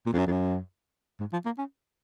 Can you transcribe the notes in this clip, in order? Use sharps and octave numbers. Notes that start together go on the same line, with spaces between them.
A#2
F2
F#2
F2
F#2
G#2
F3
A#3
C#4